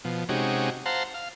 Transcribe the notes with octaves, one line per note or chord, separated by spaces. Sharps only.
B2 F3
C3 G#3 C#4 D#4 F#4 G4
C5 F5 F#5 A5 A#5 C6
F5